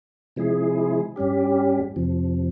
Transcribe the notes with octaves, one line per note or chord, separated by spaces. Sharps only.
C3 F3 G#3 E4 G#4
G2 G3 C#4 G4
F2 C3 F3